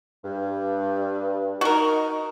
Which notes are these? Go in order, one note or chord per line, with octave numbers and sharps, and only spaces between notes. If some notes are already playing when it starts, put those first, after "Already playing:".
G2
D#4 F#4 A#4